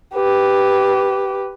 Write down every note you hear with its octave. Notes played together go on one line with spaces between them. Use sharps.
G4 B4